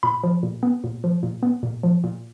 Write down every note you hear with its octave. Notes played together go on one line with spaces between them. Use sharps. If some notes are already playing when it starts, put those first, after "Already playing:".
A#2 B5
F3
A#2
B3
A#2
F3
A#2
B3
A#2
F3
A#2